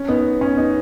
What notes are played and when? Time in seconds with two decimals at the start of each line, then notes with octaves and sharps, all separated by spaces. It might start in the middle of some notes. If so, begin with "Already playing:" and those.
Already playing: C#4
0.08 B3 D#4
0.41 C#4
0.57 B3 D#4